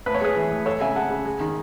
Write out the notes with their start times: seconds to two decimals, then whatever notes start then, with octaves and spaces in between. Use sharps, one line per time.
0.06 A2 B4
0.15 C#5
0.21 G#3 G#4 B4
0.36 E3
0.51 A2
0.66 G#3 A4 C#5
0.81 C#3 E5 G#5
0.95 G#3 F#5 A5
1.11 C#3
1.25 G#3
1.40 D#3